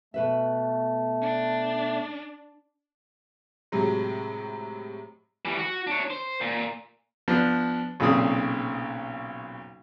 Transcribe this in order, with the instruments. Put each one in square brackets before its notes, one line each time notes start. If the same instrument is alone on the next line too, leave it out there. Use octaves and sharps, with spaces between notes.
[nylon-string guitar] B2 B4 E5 [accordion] A3
[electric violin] D4
[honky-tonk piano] A2 C3 F#3 G#3
[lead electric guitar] E3 G3
F#4
D4 C#5
C5
A#2
[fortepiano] F3 B3 D4
B1 A#2 C#3 C4 D#6